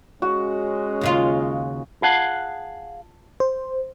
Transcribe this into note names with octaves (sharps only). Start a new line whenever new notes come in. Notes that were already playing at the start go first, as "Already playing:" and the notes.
G#3 C#4 F#4
D#2 C#3 F4
F4 G#4 F5 F#5 A5
C5